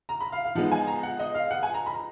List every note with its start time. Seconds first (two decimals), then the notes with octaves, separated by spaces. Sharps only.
0.09 A#5
0.20 B5
0.32 F5
0.45 F5
0.55 F3 G#3 B3 D#4 F#5
0.72 G#5
0.87 A#5
1.03 F#5
1.19 D#5
1.34 F5
1.51 F#5
1.63 G#5
1.74 A#5
1.86 B5
1.93 A#5